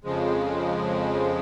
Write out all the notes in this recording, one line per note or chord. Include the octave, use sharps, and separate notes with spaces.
F2 C#3 F3 G#3